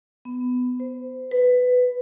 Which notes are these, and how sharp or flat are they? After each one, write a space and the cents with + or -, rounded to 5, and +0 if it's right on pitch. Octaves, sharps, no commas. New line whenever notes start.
B3 +15
C5 -20
B4 +10